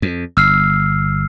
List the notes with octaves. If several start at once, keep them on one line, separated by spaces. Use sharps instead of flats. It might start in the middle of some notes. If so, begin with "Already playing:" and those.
F2
G1 E6 F6 C7